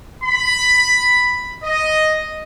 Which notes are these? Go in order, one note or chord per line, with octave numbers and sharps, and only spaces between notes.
B5
D#5